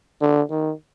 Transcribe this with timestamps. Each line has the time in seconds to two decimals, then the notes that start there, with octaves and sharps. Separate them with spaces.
0.21 D3
0.50 D#3